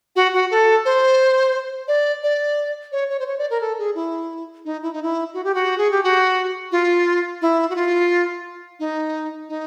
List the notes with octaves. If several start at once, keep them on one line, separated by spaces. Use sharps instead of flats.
F#4
F#4
A4
C5
D5
D5
C#5
C#5
C5
C#5
D5
A#4
A4
G#4
E4
D#4
E4
D#4
E4
F#4
G4
F#4
G#4
G4
F#4
F4
E4
F#4
F4
D#4
D#4